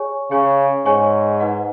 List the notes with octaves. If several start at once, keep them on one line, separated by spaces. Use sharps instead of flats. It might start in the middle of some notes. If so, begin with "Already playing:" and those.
Already playing: G#4 C#5 G#5 C#6
C#3 G#4 C#5 G#5 C#6
G#2 G#4 C#5 G#5 C#6
D#4 B4 D#5 F#5